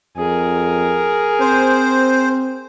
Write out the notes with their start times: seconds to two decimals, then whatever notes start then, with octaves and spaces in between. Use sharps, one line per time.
0.17 F2 G#4 A#4
1.40 C4 C5